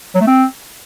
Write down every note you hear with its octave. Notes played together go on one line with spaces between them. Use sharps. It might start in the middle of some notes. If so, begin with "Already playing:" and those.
F#3
A3
C4